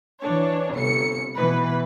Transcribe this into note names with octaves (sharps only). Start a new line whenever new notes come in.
E3 D4 C#5
G1 C3 C#7
B2 E3 B4